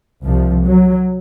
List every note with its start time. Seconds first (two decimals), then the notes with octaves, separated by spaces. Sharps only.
0.24 C2 C3 F3
0.64 F#3